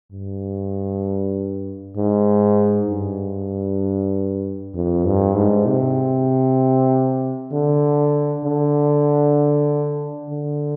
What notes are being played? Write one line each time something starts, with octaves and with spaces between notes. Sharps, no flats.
G2
G#2
G2
F2
G2
G#2
C3
D3
D3
D3